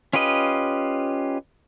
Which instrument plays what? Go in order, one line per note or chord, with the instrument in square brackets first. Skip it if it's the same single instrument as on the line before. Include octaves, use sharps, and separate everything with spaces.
[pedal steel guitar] C#4 F4 G4 B4 D#5